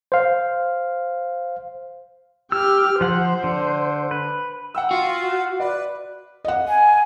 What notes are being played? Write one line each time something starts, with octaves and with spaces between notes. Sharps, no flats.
C5 F5
G4 E6 F6
F3 C5 F#5
D3
B4
F#5 G5 E6
F4 F#4 F5
B4 D5
D#5 F#5
G#5